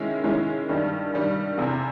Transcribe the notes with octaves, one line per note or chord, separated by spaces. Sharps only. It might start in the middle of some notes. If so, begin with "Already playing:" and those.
Already playing: D#3 G#3 C#4 E4
D#3 G#3 C#4 E4
G2 D#3 G3
G2 D#3 G3
F1 E2 C3